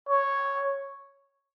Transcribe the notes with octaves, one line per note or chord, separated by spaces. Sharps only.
C#5